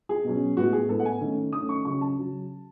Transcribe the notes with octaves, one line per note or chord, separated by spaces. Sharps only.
G#4
B2 F#3 C#4
A2 G#3 B3 F#4
G#4
A2 G#3 B3 A4
F#5
G#5
D#3 A3 C#4
D#3 A3 C#4 D#6
C#6
C#3 F#3 C#4 C#6
A5
C#3 F#3 C#4